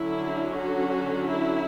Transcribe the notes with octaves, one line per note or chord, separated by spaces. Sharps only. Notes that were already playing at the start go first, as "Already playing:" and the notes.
Already playing: D3 F#3 C#4 E4
F#4
E4